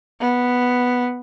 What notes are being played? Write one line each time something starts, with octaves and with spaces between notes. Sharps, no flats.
B3